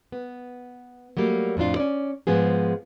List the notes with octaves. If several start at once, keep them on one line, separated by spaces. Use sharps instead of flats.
B3
F#3 G3 A3 A#3
F2 A2 D4 F4
C#4 D5
G#2 F3 G#3 B3 G#4